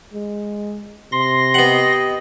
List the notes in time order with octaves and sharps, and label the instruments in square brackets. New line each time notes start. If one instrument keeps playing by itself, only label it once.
[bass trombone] G#3
[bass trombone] C3 [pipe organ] C6 A#6
[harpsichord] B3 F#5 [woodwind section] G4 D#5